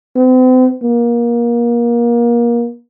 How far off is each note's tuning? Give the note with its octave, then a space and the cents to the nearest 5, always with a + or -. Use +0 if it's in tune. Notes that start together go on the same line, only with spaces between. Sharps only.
C4 -40
A#3 +25